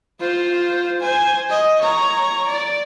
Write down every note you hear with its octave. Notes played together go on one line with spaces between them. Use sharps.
F4 C5
C5 G#5
D#5
C#5 A#5
D5